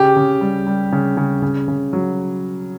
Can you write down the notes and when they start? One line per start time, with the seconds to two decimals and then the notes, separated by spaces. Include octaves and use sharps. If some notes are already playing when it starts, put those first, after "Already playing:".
Already playing: C#3 G4
0.16 C#3
0.41 G3
0.67 G3
0.92 C#3
1.17 C#3
1.42 C#3
1.68 C#3
1.93 F#3